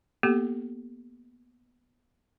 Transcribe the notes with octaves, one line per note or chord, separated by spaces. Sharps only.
A#3 B3 G4 A4